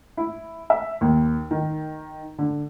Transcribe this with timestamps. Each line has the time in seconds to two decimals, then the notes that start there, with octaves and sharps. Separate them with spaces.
0.17 E4
0.70 E5
1.01 D#2
1.51 D#3
2.38 D3